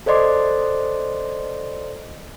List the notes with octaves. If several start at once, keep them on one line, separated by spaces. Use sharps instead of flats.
A4 C5 D5 D#5 C6 D6